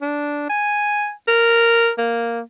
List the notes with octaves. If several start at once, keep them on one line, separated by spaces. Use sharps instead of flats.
D4
G#5
A#4
A#3